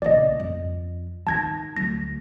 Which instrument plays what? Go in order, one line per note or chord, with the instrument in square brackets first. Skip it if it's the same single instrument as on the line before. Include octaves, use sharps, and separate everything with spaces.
[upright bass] A#1 C#3 [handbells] D5 D#5
[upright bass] F2
[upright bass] D#3 D#4 [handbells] A5 G#6 A#6
[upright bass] D2 F#3 [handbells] A#6